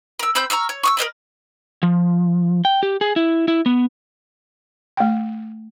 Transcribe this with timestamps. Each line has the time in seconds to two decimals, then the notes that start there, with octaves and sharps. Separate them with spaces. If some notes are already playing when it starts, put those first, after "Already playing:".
0.19 A#4 E6
0.35 C4 B5 E6 G6
0.50 A#5 C#6 E6 F6
0.69 C#5
0.83 C#6 D#6 E6
0.97 A#4 C5 D#5 B5
1.83 F3
2.65 G5
2.83 G4
3.01 G#4
3.16 E4
3.48 E4
3.66 B3
4.97 A3 G5